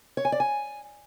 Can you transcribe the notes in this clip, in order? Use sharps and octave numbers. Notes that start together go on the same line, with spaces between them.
C#5
G#5
D5
G#5